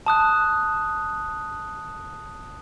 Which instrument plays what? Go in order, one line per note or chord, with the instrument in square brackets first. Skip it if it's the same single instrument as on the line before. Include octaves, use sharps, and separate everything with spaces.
[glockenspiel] A5 D#6 F#6